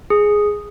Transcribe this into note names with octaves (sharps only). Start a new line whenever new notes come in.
G#4